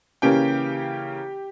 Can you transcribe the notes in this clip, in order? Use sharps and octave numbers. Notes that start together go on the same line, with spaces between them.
C#3 E3 A#3 C#4 G4 G5